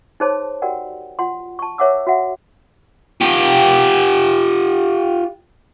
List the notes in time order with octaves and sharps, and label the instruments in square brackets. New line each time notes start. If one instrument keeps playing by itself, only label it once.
[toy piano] D#4 G#4 C5 C#5 A5 C6
F#4 G4 A#4 D5 F#5 G5
F4 F#5 C6
A5 C#6
A#4 C#5 E5 F#5 D6 E6
F#4 E5 F#5
[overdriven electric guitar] F4 G4